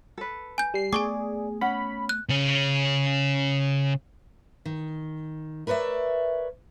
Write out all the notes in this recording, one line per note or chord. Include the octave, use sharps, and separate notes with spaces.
A4 B4
G#5 G6
G3 C7
A3 B3 G#4 D5 G#5 C#6 D6
C#4 F#5 B5
F#6
C#3 C#4
D#3
A#4 B4 C#5 D5 E5